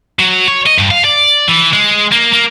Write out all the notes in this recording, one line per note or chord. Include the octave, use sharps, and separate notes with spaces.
F#3
C#5
D#5
G2
F5
D5
E3
G#3
A#3
A#3